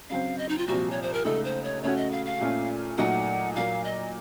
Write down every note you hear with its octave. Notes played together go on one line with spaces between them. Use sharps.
C#3 F#3 C4 F5
D#5
D#4
F4
C2 A#2 F3 C4 F#4
C#5
C5
A#4
C#2 C#3 A3 D#4 A4
C5
C#5
C#3 A3 C#4 F#4 C#5
D#5
F5
F5
A#2 A3 C#4 F4
A#2 F#3 A3 D#4 F#4 F#5
A#2 F#3 A#3 F5
D#5